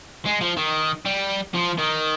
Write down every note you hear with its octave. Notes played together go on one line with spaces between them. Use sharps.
G#3
F3
D#3
G3
F3
D#3